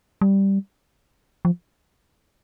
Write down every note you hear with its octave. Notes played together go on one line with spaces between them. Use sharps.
G3
F3